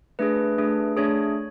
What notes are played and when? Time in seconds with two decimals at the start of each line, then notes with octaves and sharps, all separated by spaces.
0.19 A3 D4 G#4 B4
0.58 A3 D4 G#4
0.97 A3 D4 G#4 C#5